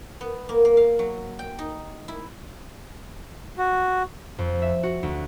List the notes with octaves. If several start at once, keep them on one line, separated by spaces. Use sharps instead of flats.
B3
A#3
A#3
F5
F#3
G5
D#4
E4
F#4
F2
E5
F#4
D2